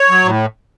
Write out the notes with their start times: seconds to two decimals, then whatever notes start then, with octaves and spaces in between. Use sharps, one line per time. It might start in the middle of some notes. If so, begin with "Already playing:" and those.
Already playing: C#5
0.09 F#3
0.24 A2